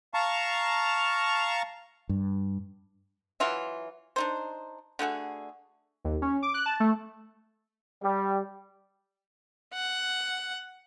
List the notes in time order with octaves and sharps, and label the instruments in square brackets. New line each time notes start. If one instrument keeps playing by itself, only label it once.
[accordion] F5 A5 A#5 C#6
[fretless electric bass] G2
[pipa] E3 F#3 F4 E5
D4 D#4 C5
D3 A3 F#4 G#4
[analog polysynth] D#2
C#4
D6
F#6
A5
A3
[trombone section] G3
[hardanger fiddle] F#5